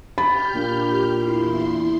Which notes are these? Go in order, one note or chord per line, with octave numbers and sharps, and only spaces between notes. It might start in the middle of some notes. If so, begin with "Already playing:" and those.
G4 B5 F6 G6 A6
A#2 D4
E2 E4 C6